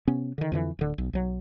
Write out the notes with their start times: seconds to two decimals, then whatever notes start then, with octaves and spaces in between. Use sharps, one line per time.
0.07 C3 B3 C#4
0.38 D3 D#3
0.52 F2 D3 E3
0.79 D1 D3
0.98 B1
1.13 B1 F#3